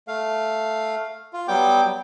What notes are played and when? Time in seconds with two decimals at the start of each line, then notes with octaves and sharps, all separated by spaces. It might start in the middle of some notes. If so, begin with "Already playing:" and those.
0.08 A3 F5
1.33 F4
1.48 F#3 G3 B3 G5 D6